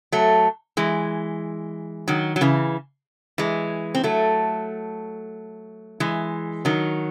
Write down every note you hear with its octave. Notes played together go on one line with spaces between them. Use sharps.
F#3 A3
E3 G#3
D#3 F#3
F#3
C#3 E3
E3 G#3
C4
F#3 A3
E3 G#3
D#3 F#3